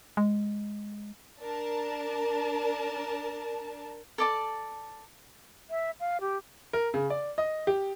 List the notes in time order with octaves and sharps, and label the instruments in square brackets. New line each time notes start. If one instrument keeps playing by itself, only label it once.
[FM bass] G#3
[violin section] D4 A#4 A5
[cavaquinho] A4 D5 A5
[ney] E5
F5
G4
[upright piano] A#4
C#3
D5
D#5
G4